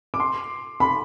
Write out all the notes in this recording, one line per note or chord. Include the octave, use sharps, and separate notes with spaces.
D6
C6
B5